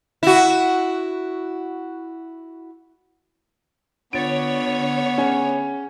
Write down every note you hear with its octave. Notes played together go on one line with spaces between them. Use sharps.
E4 F#4
D3 B3 D4 F4 C#5 A6 D7
C#4 G#4 F#5 G#5